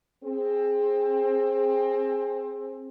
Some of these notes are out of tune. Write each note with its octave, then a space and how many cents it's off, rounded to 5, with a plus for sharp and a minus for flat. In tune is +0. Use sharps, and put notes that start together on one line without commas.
C4 +20 G#4 +0